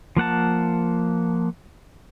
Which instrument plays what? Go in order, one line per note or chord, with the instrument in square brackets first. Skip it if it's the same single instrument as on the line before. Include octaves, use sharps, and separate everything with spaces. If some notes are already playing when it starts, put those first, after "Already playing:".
[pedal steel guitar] F3 A#3 F#5 A5